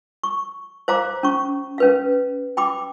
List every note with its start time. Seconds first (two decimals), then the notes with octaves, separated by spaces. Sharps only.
0.24 C#6
0.88 C5 F5 A#5 D6
1.23 C#4 C#6
1.78 C#4 B4 F5
2.57 G5 B5 D6